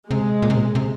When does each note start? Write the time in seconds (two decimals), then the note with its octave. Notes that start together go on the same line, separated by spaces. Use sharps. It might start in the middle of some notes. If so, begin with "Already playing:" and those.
0.10 C3 G#3
0.42 A#2
0.50 C3
0.57 A#2
0.75 C3